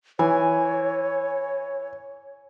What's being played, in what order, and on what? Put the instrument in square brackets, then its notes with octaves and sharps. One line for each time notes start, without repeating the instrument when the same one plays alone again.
[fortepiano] E3 [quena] C#5 [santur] G#5